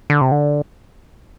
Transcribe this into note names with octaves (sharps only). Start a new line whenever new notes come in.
D3
C3
D3